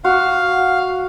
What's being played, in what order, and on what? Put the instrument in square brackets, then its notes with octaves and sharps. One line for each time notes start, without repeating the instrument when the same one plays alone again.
[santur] F#4 [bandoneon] F5